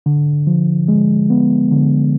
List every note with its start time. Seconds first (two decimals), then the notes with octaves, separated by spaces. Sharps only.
0.06 D3
0.47 F3
0.88 G#3
1.30 B3
1.71 D3